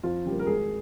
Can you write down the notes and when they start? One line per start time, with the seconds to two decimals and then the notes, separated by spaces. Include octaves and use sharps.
0.03 F2 F4
0.25 C#3 G3 A#3
0.39 A#4
0.47 G#1 G#4